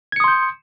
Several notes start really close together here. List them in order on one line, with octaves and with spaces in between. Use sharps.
G#6 C#7 D#6 C6 G6